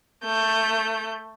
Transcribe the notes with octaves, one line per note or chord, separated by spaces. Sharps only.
A3 G6